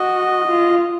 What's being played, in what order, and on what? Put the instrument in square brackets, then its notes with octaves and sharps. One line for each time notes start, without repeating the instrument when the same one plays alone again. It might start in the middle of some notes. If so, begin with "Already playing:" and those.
Already playing: [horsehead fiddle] F#4 [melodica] D#5
[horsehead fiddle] F4